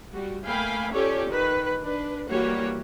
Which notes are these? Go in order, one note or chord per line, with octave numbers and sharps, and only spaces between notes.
G3 F#4
A3 A#3 F5 G5 G#5 B5
C#4 F4 G4 A4 C#5 D5
D#3 B4
D4 B4
E3 G3 A#3 F#4 G4 C#5